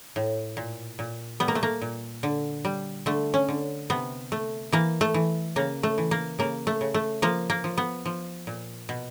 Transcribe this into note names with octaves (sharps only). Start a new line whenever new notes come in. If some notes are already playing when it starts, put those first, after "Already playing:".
A2
A#2
A#2
G3 B3
A#3
A3
A#3
A#2
D3
G3
D3 A3
C#4
D3
C3 B3
A3
E3 A#3
A3
E3
C#3 A#3
A3
E3
A#3
C#3 A#3
A3
C#3
A3
F3 A#3
A#3
F3
B3
F3
A#2
B2